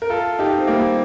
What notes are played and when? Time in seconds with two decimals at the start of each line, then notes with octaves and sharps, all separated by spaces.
0.02 A#4
0.10 F4 A4
0.39 D#4 G4
0.58 C4
0.67 G3 A#3